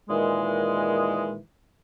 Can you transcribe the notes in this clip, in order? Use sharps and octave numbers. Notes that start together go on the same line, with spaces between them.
A#2 D#3 E3 G#3